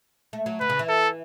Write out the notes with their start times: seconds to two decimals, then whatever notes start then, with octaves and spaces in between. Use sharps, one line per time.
0.33 A3
0.46 F#3
0.60 D3 B4
0.70 C#3
0.79 E3
0.89 A4